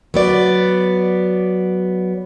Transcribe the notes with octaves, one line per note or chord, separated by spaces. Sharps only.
F#3 B3 D5